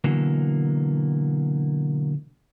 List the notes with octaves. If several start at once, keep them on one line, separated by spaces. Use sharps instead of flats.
B2 D3 E3 F#3 A#3